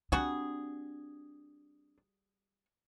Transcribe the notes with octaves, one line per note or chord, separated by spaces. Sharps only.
G3 C4 D4 F#4 G#4